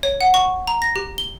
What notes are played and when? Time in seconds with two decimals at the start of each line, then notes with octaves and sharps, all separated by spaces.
0.03 C#5
0.21 F#5
0.34 C#6
0.67 A#5
0.82 A#6
0.96 G4
1.18 G7